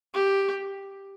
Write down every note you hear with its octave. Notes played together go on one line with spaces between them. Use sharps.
G4